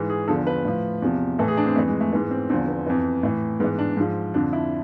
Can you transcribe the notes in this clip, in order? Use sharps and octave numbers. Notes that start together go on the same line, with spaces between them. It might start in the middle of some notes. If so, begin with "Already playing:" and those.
Already playing: G#2 E3
G#4
E2 D3 F3 A4
B4
A2 F3
E2 C3 F3
A2 E3 A4
G#4
D4
C4
F2 E3 A3
G#3
A3
G#2 E3 B3
C4
E2 D3 F3 C4
B3
F2 E3
A2 E3
G#2 E3 B3
D4
G#2 F3
F2 D3 F3 D4
E4